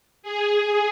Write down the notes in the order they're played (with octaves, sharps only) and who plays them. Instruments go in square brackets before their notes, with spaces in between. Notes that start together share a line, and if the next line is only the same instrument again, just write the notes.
[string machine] G#4